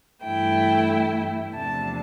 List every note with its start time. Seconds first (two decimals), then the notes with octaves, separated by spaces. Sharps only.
0.24 G2 E3 A3 E4 G5
1.55 E2 C3 F3 A3 D4 A5